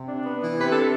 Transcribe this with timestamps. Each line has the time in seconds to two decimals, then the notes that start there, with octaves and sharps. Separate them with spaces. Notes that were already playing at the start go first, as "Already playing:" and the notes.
Already playing: C3
0.08 D4
0.24 B3
0.41 E3
0.57 C3 B4
0.70 D4 A4